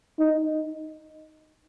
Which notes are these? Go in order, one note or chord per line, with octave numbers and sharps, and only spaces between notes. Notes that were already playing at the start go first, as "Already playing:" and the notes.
D#4